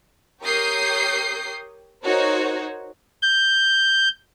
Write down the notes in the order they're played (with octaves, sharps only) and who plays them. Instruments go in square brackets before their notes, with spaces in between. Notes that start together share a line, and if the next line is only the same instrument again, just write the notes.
[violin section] G4 A#4 C#5 D#6 G6 C7
D#4 F#4 A#4 C5 C#5
[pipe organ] G6